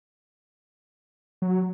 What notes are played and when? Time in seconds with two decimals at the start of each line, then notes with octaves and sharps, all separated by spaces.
1.42 F#3